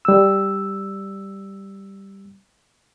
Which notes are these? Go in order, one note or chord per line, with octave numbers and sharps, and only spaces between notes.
G3 E6